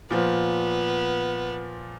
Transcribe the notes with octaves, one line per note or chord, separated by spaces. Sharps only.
A#2 F3 B3